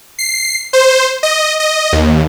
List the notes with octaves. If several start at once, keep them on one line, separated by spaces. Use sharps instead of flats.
C7
C5
D#5
D#5
D#2